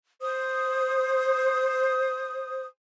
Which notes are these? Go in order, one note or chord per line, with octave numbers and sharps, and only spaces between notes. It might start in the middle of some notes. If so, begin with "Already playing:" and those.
C5 D#6